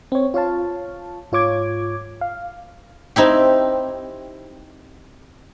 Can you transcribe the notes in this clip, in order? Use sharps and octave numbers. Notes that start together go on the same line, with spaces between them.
C4 C#5
F4 C#5 F5 A5
G#2 F4 C#5 D6 G#6
F5
C4 D#4 E4 G4